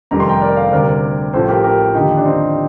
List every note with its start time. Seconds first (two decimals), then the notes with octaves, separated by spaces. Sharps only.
0.11 F1 F2 D#3 G3 A#5
0.20 C6
0.29 G5 A#5
0.42 A#4 D5
0.57 D5 F5
0.72 D2 C3 G3 A#4 D5
1.33 A1 A2 F3 A4 C5
1.48 G4 A#4
1.64 G4 A#4
1.94 D#2 D3 F3 D#4 G4
2.17 D4
2.25 C4 D#4